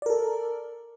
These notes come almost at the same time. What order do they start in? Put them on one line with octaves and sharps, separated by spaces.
D5 A#4 A4